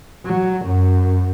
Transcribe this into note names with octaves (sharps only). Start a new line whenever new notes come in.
F#3
F#2